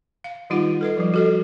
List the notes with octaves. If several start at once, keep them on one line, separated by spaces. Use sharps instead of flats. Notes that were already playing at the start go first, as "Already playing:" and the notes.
F5
D#3 G3 D#4 F4 G4 F#5
A4 B4 D#5
F3 G3
F#4 A4 D#5